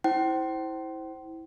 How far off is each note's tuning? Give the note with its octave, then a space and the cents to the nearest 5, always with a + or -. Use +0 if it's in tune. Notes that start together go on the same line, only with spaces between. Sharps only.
E4 -20 C5 +0 G5 -40